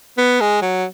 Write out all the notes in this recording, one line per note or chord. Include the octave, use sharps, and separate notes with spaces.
B3
G#3
F#3